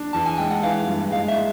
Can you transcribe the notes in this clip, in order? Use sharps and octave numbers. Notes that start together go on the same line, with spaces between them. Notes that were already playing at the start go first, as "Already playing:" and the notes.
Already playing: D4
E2 A5
G#5
G#3 G5
F#5
E3 F5
G2
G#3 F5
E5
G#3